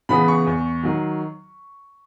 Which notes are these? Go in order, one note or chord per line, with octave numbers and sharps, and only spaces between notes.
C#3 E3 B3 B5
C#6
E2
D#3 F#3